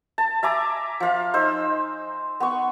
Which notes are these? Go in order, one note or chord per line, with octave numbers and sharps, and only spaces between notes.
A5
E5 G#5 A#5 D6
F3 F5
D#4 C5 E6
B3 C#6